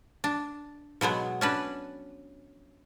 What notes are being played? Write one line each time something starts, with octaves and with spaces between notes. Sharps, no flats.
D4
B2 F#3 G#3 B3
C#4 D4 B4